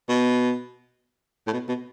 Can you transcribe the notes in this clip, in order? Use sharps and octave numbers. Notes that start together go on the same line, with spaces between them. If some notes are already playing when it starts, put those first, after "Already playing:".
B2
A2
B2
B2